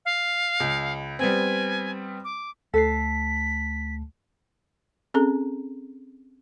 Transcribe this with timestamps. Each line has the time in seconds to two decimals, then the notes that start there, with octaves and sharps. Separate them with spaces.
0.05 F5
0.60 C#2
1.19 G3 B3 C4 G#5
2.24 D6
2.74 D2 A3 A4 B6 C7
5.14 C4 C#4 G#4 A4 A#5